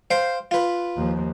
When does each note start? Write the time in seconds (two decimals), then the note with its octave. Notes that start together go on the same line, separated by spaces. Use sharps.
0.11 C5 F5 G5
0.51 F4 B4
0.96 D#2 F3